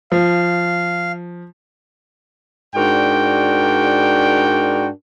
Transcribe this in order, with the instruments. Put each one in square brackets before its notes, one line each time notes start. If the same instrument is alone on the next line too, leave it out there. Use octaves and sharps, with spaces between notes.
[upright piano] F3 [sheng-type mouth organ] F5
[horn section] G#2 D4 F#4 A#4 D5 G5